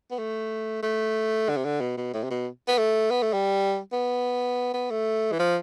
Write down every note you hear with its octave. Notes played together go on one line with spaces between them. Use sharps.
B3
A3
A3
D3
C3
D3
B2
B2
A2
C3
B2
B3
A3
B3
A3
G3
B3
B3
A3
E3
F3